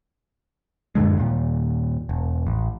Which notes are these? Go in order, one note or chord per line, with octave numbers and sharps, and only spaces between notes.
F#2 A#2 D3 G#3
D#2 A#2
E1
A1